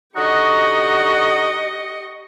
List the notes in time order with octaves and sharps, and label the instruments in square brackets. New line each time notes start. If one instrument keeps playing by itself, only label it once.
[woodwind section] D3 D#4 F#4 [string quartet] G4 D#5 C#6